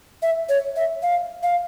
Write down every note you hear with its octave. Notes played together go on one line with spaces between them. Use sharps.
E5
C#5
E5
F5
F5